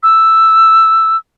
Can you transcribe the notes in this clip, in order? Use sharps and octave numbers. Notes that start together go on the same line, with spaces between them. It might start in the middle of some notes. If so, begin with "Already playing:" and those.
E6